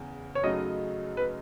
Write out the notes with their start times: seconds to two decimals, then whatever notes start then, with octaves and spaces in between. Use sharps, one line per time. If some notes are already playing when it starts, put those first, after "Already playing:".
Already playing: E2 C#3
0.35 C#5
0.43 F#2 C#3 F#3 A3 D#4 D#5
1.17 B4